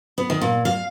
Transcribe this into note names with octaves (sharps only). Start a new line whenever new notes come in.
B3
D#3
A#2
F5